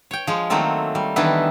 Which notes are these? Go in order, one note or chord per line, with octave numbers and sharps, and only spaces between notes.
C#5 G5
F3 G#3
D#3 F#3 A3 A#3 C4 A4
G3
D#3 E3 B3 D4 E4 B4